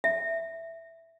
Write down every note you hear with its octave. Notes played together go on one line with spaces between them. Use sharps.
E5